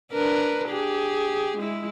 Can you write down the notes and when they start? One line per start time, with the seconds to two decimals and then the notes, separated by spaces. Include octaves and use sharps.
0.12 D4 A#4 B4
0.70 G4 G#4
1.58 G#3 E4